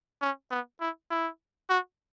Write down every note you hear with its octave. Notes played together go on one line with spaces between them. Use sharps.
C#4
B3
E4
E4
F#4